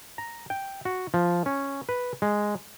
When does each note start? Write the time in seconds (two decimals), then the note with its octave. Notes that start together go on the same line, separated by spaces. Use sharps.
0.18 A#5
0.50 G5
0.85 F#4
1.14 F3
1.46 C#4
1.89 B4
2.22 G#3